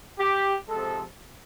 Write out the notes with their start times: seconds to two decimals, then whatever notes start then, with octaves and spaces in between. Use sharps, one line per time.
0.18 G4
0.68 C3 F3 G#3 A4